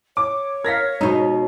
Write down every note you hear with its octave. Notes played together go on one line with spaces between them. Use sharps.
C#5 D6
A#4 F5 G#6 A#6 B6
B2 G#3 D#4